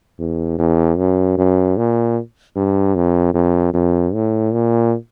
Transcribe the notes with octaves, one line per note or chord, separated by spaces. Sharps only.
E2
E2
F#2
F#2
A#2
G2
F2
F2
F2
A2
A#2